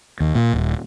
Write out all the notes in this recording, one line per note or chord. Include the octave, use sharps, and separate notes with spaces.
D#2
A#2
D#1